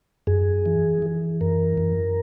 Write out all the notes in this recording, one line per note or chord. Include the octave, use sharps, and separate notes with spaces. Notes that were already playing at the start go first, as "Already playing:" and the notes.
F#2 G#4
E3
E3
F#2 A#4
F#2